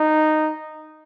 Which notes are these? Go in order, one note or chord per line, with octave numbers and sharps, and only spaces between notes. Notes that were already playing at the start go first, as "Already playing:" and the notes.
Already playing: D#4